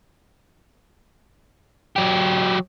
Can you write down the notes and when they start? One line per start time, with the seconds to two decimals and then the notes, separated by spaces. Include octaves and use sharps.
1.96 F#3 G4